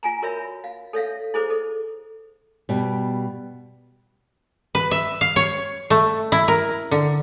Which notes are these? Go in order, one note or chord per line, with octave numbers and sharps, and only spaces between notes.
F4 G#5 A#5
F#4 A#4 C#5 E5 B5
F5
A4 C#5 E5 F5
E4 G#4 A4 C5 D6
A4
B2 G3
B4
E5
F5
C#5
A3
E4
A#4
D3